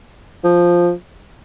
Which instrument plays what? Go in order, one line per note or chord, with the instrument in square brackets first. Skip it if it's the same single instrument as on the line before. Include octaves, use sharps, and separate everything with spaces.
[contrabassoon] F3